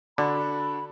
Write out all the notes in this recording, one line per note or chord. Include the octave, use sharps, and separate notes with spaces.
D3 D4 F#4 A4 B5